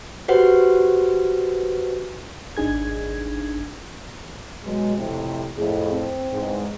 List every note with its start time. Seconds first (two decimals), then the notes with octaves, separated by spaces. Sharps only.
0.28 F#4 G4 B4 C5 F#5
2.57 G#1 D4 D#4 G#4 G#6
4.64 B2 F#3 G#3
4.96 F2 A2 C3
5.58 F2 A2 G#4
5.92 C4
6.32 E2 G#2